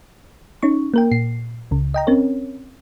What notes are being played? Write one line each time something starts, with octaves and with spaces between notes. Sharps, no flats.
C#4 D#4 C#6
A#3 A#4 G5
A#2 C7
C#2 C#3
D#5 G5 A#5
C4 C#4 A#4 C#5